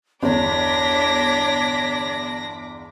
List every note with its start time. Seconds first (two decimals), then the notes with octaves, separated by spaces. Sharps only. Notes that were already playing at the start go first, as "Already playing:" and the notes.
0.23 G1 E2 D4 C#5 D6 A#6 B6